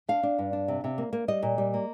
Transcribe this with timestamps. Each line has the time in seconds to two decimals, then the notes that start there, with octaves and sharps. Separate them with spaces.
0.08 D4 F5
0.23 D4
0.39 G2
0.53 D4
0.68 C3
0.84 C3
0.98 A#3
1.13 A#3
1.28 G3 D#5
1.43 A#2
1.58 G3
1.74 A#3